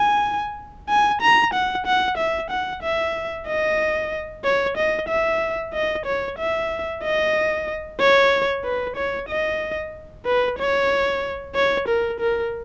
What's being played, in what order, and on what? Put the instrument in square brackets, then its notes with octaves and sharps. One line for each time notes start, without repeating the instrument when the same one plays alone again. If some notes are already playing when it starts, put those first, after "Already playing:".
Already playing: [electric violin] G#5
G#5
A#5
F#5
F#5
E5
F#5
E5
D#5
C#5
D#5
E5
D#5
C#5
E5
D#5
C#5
B4
C#5
D#5
B4
C#5
C#5
A#4
A#4